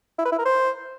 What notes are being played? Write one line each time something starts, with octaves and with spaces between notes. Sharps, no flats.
E4
B4
E4
A#4
C5